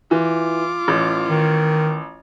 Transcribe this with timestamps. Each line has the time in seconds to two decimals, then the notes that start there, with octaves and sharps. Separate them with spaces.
0.11 E3 F4 D6
0.88 A1
1.28 D#3